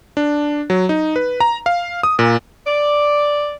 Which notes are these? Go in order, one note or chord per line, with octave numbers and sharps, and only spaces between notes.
D4
F#3
D#4
B4
A#5
F5
D#6
A#2
D5